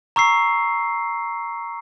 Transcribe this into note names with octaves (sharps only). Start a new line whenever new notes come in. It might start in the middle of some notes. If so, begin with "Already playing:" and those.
A#5 C#6 E6 C7